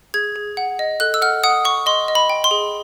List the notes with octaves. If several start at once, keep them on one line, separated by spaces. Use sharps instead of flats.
G#4 G#6
G#4
F#5
D#5
A4 F#6
E6
F#5 F6
F#5 D#6
F#5 C#6
D#5 C6
D#5
B5
G5
C6
G#4